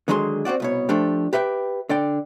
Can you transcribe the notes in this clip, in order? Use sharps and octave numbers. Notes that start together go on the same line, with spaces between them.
D3 D#3 F#3 G#3 G#4 C6
C4 D#4 F#4 D5
C2 B2 C#5
F3 A3 D4 G4
G4 B4 E5 F#5 G5
D3 D5 G5